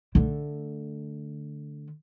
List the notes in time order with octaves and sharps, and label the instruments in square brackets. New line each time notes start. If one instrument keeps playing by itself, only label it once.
[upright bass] D3 A3